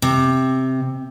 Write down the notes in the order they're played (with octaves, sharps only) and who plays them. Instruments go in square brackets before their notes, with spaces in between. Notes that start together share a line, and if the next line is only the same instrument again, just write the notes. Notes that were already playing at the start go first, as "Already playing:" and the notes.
[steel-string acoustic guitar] C3